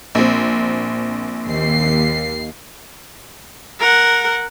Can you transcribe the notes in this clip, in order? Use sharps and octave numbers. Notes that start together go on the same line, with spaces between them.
A#1 C4
D#2 C7
A#4 F#5